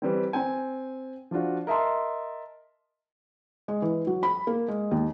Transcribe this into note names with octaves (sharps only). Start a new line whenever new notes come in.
E3 G3 C4
C4 G5 G#5
F3 D4 F4 F#4
A#4 D#5 E5 A5 C6
G#3
E3
F#3
B5
A#3
G#3
D#2